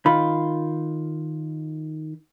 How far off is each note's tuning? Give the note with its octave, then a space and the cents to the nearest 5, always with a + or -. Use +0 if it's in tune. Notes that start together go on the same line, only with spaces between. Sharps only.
D#3 +0 F4 +0 B5 +0